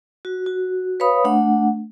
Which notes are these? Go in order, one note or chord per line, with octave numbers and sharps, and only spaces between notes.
F#4
F#4
B4 C#5 F5 B5 D#6
A3 D4 F#5